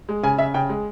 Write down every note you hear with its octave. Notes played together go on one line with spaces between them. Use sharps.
G#3
C#3 G#5
C#3 E5
C#3 G5
G#3